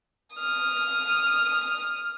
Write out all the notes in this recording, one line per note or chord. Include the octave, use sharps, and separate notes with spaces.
D#6 F6